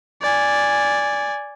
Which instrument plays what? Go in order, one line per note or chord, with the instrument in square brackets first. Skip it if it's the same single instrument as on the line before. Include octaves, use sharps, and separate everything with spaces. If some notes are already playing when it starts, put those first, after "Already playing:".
[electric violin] D5 G#5